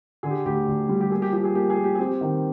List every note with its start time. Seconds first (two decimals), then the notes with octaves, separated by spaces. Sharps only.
0.23 D3 G#4
0.30 G4
0.45 D2 G4
0.68 D2
0.89 G3
1.01 G4
1.10 A#3 G#4
1.22 G4
1.32 F3 G4
1.44 G#4
1.55 A#3 G4
1.70 G#4
1.77 A#3
1.84 G4
1.95 G#4
1.99 C4 G4
2.21 D#3